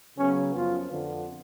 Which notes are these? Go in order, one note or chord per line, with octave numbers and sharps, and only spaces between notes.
C#3 F#3 B3 C#4
F#2 F3 B3 F4
F2 D3 F3 B3